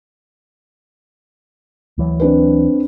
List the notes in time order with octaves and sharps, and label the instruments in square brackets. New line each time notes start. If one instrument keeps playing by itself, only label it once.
[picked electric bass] D2 E3 F#3
[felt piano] C4 D4 B4